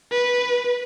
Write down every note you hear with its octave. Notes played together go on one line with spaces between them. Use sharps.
B4